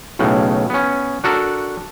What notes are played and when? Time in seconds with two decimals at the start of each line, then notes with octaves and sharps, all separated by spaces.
0.19 B1 A2 C#3
0.70 B3 C#4
1.24 D4 F#4 A4 A#4